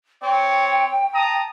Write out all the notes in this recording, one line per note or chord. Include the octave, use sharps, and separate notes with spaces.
C4 C#5 G5
A5 A#5 D#6